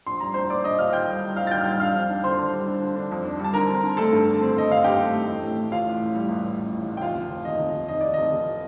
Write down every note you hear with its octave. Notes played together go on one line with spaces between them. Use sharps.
A#1 C6
G3 A#5
A#1 C5 C6
A#2 D5 D6
D4 D#5 D#6
A#2 F5 F6
A#2 G5 G6
G3
G3
A#1 F5 F6
A6
G3 G5 G6
F6
G3 G5 G6
D4 F5 F6
F2
D4
D3 C5 C6
D4
G3
D3
D3
D4
F2
D4
G3
A5
D3 A#4 A#5
C4
D3
A3 A4 A5
G2
D3
C4
G2 D#5
D3 F5
G2 G4 G5
A3
A3
A1
A2
A2
A2 F4 F5
A1
A2
G3
A1
A1
A1
A1
A1
G5
F1 F4 F5
F1
F1
D#2 D#5
F1
F1
D#3 D#5
D#3 D5
F1 D#5
F1